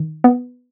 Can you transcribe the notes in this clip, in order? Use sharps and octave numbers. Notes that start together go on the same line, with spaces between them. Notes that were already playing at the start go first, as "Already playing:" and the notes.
Already playing: D#3
B3